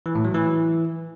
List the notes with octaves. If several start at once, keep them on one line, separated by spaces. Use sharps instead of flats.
E3
A2
F#3
E3